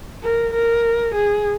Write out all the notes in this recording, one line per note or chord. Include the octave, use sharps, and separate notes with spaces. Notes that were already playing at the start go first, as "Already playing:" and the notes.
A#4
A#4
G#4